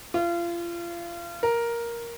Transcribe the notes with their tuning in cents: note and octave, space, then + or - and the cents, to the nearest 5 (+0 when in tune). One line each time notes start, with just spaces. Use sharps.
F4 -30
A#4 +5